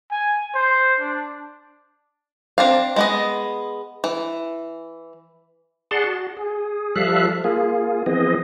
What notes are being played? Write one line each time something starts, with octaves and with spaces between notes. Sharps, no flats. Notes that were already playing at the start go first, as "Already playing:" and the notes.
G#5
C5
D4
C4 D4 F5
G#3 B3 D#5
E3
G#4 D5 F#5 A5 C6
F#4
G#4
F3 G3 A4 E5 F5 F#6
A#3 F4 G#4
E3 F3 B3 C4 G#4 D#5